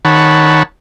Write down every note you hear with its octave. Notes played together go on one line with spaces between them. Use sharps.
D#3 C#5 F#5 A5 B5